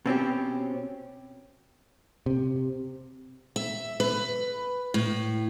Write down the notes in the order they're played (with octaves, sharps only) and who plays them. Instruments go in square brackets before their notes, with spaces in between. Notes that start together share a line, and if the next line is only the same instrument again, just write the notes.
[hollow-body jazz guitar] B2 C4 C#4 G4
[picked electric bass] C3
[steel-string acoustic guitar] E5
B4
A2